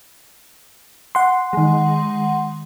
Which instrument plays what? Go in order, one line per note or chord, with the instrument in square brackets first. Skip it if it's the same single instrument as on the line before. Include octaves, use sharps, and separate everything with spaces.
[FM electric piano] F#5 C6
[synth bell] D#3 G#3